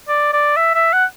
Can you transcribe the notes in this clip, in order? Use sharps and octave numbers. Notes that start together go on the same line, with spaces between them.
D5
D5
E5
E5
F#5